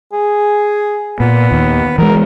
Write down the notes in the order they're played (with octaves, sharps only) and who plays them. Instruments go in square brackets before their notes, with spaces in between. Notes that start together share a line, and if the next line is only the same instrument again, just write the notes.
[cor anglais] G#4
[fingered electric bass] A#2 [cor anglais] B3
[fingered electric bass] D#2
[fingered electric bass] E3 G#3 [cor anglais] A#4